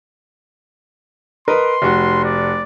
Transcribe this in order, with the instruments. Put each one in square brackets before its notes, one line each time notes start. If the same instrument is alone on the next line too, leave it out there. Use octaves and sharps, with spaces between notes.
[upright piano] A#4 B4 D#5 [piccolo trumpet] C6
[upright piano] F1 F#4
[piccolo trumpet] D5